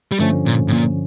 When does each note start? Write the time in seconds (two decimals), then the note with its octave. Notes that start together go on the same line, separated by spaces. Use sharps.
0.12 G3
0.19 G2 D3 F3 A3 C#4
0.46 A#2
0.68 A2
0.73 A#2